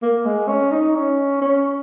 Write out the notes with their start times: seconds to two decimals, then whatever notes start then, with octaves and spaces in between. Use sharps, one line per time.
0.03 A#3
0.25 G#3
0.48 C#4
0.72 D#4
0.95 C#4
1.42 C#4